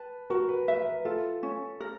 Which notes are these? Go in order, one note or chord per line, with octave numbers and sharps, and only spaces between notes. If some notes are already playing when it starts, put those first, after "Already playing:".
Already playing: B4 A5
F#4 A#4
B4
B4 E5
B4
F4 A4
C#4
A#4